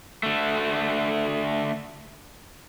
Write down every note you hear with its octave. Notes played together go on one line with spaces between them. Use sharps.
D3 A3